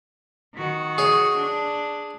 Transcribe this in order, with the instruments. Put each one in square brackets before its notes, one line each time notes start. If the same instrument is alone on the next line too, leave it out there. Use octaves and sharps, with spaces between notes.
[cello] D#3 F#4
[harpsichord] G#4 C#5
[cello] D4